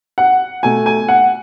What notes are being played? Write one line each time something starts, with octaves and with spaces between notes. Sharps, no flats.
F#5
B2 A3 G#5
G#5
F#5